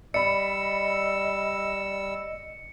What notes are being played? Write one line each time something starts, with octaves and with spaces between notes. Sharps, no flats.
G3 D5 D#5 B5 E6 C#7